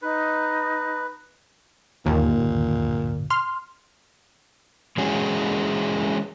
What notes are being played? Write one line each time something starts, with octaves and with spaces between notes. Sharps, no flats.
D#4 B4
D1 G1 D#2 A#2
C6 F6
E3 G#3 C#4 F#4 G#4